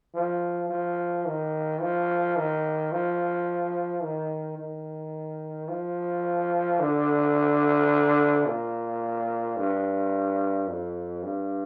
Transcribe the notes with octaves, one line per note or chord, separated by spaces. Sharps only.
F3
F3
D#3
F3
D#3
F3
D#3
D#3
F3
D3
A#2
G2
F2
G2